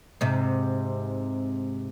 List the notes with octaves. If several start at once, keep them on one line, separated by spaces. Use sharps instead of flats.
G#2 C3